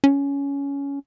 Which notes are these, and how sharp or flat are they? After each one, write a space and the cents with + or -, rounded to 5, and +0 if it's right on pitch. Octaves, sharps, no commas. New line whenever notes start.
C#4 +15